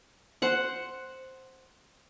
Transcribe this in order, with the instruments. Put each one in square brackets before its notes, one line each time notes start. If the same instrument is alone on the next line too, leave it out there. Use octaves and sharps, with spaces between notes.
[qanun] C5 F#5